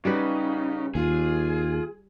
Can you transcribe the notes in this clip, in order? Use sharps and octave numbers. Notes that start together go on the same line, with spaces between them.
C#3 G3 D#4 F#4 B4
D#2 F4 G#4